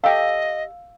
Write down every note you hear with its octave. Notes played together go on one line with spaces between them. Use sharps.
G4 A4 D#5 F5 E6